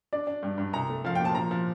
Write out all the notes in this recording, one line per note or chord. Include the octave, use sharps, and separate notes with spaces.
D4 D5
D4
G2
G2
C2 A#5
A3
F3 F5
A#2 G5
A5
F3 A#5
F3